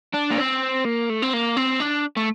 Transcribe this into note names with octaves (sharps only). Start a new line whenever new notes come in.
D4
A#3
C4
A#3
A3
C4
A#3
C4
D4
A3